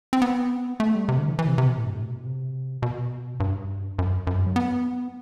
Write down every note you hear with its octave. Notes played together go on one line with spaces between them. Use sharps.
C4
B3
A3
G3
C3
D3
E3
E3
C3
C3
B2
A2
G2
A2
B2
C3
B2
G2
F#2
F#2
G2
F#3
B3